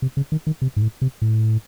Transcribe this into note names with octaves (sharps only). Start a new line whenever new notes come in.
C3
C#3
D#3
D#3
C3
G#2
A2
C3
A2